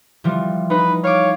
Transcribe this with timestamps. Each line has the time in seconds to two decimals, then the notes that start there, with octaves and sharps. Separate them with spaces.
0.24 E3 F3 G3
0.70 D#4 B4
1.04 C#5 F5 D6